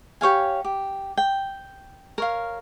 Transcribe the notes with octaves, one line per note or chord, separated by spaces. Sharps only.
G4 C#5 F5 G#5
G4
G5
A#4 C#5 F5